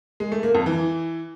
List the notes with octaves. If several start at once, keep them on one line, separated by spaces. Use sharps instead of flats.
G#3
A3
A#3
F2
E3